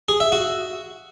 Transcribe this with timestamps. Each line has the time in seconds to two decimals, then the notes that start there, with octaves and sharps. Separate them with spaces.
0.09 G#4
0.20 E5
0.32 F#4